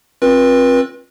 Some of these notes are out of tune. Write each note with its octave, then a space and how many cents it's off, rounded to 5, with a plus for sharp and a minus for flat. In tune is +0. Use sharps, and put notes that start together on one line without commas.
C4 +30 F4 +25 B4 -35